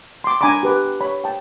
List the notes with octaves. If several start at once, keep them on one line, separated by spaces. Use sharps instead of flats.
C6 D6
D4 G#5 A#5 B5 D6
G4 B4 D6
C#5 B5
G5 A5